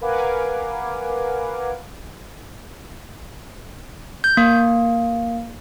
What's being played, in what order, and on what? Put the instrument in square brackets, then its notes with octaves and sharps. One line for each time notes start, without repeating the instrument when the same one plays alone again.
[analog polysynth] A#4 B4 F5 F#5 G#5 D6
[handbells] G6
A#3